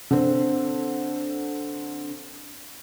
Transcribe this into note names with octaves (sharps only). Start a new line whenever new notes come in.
D3 C4